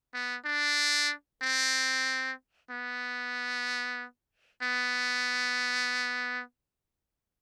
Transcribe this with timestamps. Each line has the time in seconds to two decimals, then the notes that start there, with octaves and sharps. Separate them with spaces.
0.14 B3
0.45 D4
1.42 C4
2.71 B3
4.63 B3